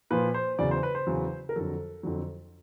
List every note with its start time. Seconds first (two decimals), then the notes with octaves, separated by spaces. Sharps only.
0.10 A#2 F3 B4
0.34 C5
0.59 E2 C#3 F#3 D5
0.71 C5
0.83 B4
0.95 C5
1.07 E2 C#3 F#3
1.49 A#4
1.56 F2 D3 F#3 A4
2.03 F2 D3 F#3